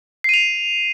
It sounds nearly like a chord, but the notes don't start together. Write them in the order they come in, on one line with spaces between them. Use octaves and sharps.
C7 D#7 F7